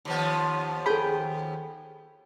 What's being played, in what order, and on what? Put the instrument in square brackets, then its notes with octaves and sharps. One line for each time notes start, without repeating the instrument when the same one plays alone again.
[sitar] D#2 F3 B3
[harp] G#4 G5 [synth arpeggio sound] A4 B5